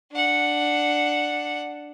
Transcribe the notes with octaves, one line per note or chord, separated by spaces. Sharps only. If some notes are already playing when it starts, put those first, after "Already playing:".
D4 F#5